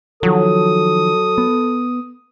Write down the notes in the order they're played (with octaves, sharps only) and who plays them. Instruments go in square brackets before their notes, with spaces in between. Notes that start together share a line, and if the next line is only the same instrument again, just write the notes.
[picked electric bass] D#3 F3 [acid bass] F#3 [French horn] A4 [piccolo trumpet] D#6
[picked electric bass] B3